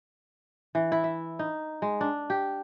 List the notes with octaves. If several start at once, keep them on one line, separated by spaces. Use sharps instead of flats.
E3
E4
E5
D#4
G#3
D4
G4